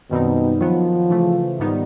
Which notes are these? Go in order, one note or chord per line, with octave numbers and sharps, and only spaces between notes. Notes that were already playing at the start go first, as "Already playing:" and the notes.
F#2 B2 D#3 G3 C4 D#4
D#3 F3 F#3 B3
C#3 E3 A3
G#2 D#3 G3 B3 D#4